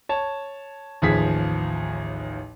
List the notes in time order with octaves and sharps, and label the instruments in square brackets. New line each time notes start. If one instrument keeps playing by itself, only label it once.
[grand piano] C#5 A5
A1 D#2 F3 G#4 B6